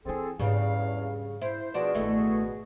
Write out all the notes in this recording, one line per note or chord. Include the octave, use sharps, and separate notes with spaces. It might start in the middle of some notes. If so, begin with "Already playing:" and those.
E3 C4 E4 G#4 A4
E2 G#2 C#3 G3 D4 F5
E4 C5
B2 F3 D4 F#4 G#4 C5
A1 D#3 A3 E4